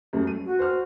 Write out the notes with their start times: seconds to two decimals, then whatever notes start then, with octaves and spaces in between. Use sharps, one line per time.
0.13 F#2 G3 A3
0.27 D#7
0.45 F#4
0.59 C5 F6